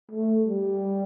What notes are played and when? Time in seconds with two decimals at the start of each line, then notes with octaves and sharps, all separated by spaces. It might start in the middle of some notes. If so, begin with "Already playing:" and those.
0.12 A3
0.44 G3